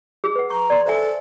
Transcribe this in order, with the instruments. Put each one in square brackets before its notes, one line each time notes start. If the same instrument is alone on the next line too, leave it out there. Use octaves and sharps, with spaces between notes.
[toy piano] G#4 E6
B4 F#5
[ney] A#5 [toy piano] C#6
[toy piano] D5 C6
[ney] A4 [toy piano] C5 E5 G#5